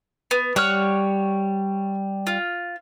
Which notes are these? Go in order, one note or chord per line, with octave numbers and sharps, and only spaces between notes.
B3
G3 C#5 F#5 F6
F4